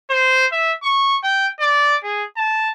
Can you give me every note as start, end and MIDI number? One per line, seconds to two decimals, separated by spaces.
0.10 0.46 72
0.52 0.72 76
0.83 1.18 85
1.24 1.48 79
1.60 1.96 74
2.04 2.24 68
2.37 2.72 81